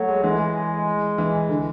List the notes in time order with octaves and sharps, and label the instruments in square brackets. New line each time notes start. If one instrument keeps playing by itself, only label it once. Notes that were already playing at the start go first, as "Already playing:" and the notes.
Already playing: [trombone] F#3 [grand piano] A3
[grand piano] G#3
[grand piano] E3 [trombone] G#3
[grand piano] E3
D3